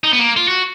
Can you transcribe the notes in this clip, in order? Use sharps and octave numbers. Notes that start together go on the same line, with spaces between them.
D#4
B3
A#3
F4
F#4